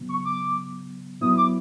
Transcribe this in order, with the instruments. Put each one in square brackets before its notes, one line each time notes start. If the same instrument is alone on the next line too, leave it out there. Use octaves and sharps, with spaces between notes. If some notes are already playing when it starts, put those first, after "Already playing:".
Already playing: [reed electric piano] C#3 F#3 B3
[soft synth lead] C#6
D6
[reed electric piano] F#3 B3 E4 [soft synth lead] D#6
[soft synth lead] D6